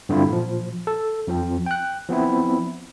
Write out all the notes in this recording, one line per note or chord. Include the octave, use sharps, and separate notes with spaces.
G2 D3 C4 E4 F4
A#2 F3
A4
F2 F3 C4
G5 F#6
F3 B3 C4 E4